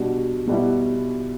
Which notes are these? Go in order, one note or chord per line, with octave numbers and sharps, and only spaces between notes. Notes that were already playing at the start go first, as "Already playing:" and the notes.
Already playing: B2 G3 D4 F#4
B2 G3 B3 E4